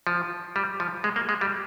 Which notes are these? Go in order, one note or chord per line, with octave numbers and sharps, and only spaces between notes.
F3
G3
F3
G#3
A#3
G#3
G3